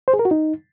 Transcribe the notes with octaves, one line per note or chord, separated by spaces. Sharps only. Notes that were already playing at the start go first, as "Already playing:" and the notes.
C5
G#4
A#4
F#4
D#4